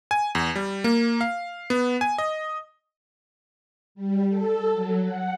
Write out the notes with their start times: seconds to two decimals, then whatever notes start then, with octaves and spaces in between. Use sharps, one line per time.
0.11 G#5
0.35 E2
0.56 G3
0.84 A#3
1.21 F5
1.70 B3
2.01 G#5
2.18 D#5
3.95 G3
4.29 A4
4.73 F#3
5.04 F#5